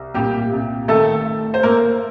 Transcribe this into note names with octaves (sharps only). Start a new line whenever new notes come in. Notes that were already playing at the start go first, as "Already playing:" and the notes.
Already playing: C2
A#2 G3 G4
C2
D#3 A3 A4
A3
C5
A3 A#3 A#4